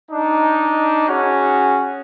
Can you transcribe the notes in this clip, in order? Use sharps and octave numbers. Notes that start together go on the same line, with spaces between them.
D4 D#4
C#4 F#4 G#4